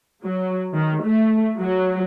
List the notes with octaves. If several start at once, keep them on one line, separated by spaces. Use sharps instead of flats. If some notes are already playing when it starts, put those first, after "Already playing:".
F#3
D#3
A3
F#3